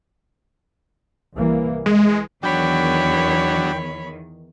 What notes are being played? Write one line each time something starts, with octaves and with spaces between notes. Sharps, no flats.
C2 E3 A#3
E3 G#3
E2 D#3 F#3 D4 C#5 G5 B5